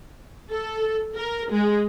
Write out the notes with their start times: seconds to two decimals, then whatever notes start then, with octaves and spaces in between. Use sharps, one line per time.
0.50 A4
1.16 A#4
1.51 G#3